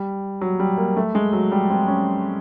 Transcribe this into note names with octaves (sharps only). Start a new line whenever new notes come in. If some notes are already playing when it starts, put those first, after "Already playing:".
Already playing: G3
F#3
G3
A#3
A3
G#3
F#3
G3
C4
C#4